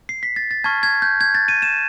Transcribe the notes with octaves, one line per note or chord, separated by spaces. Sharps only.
C7
B6
A6
A6
A5 C#6 F6 G#6
G#6
G6
G#6
A6
D#7
E7